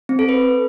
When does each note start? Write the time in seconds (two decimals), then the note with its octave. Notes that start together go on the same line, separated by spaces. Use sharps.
0.09 C4
0.19 A4
0.29 B4